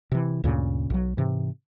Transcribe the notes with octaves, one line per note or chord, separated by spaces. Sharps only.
C3 E3
D2 G2 A#2 C#3
B1 F#3
G#2 C3 E3